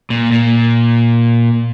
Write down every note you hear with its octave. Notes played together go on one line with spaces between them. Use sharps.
A#2
A#2